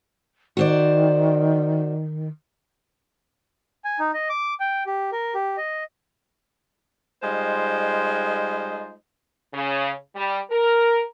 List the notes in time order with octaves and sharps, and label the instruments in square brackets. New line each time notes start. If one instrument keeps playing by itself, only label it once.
[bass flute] D#3 [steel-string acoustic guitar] F#4 C5 D5
[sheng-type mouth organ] G#5
D#4
D#5
D6
G5
G4
A#4
G4
D#5
[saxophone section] G3 G#3 D#4 F4 C5 D#5
[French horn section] C#3
G3
A#4